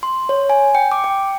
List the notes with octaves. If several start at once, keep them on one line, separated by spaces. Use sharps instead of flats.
C6
C#5
G#5
G5
D6
G5